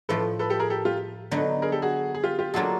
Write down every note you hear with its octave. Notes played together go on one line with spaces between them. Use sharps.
A2 F3 A3 A4 B4
A4 B4
G4 A4
G#4 A#4
G4 A4
F4 G4
D3 F#3 B3 D#4
G#4 A#4
G4 A4
F#4 G#4
G#4
F4 G4
F4 G4
F#3 A#3 D4 F4 F#4 G#4 A4